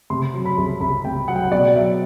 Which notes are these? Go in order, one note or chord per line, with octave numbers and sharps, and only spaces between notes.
C3 C6
F#3
B5
C2
C2 B5
C3 G5
F#3 F#5
G5
F#5
B2 D5
F#3 E5